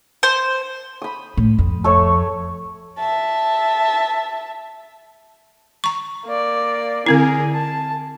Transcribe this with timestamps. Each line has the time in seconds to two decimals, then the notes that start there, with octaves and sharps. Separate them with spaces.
0.23 C5
1.02 B5 D#6
1.38 A2
1.59 F2
1.84 A3 A4 C#5
2.98 E5 A5
5.84 A#5 C#6
6.25 A#3 D5
7.06 D3 C4 E4 G#4 A#4
7.54 A5